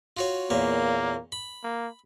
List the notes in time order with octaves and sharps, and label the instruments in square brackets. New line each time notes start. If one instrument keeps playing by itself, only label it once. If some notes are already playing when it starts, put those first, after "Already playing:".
[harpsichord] F4 F#4 C#5
[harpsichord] E2 A#2 C#5 [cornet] A#3
[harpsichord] B5
[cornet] A#3